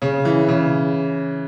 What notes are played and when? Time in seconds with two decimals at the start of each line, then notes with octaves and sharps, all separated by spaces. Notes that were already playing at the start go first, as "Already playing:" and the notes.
0.02 C#3
0.25 E3
0.48 C#3